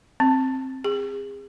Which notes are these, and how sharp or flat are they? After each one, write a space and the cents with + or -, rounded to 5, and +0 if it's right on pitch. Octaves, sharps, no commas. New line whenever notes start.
C4 +10
G#4 -30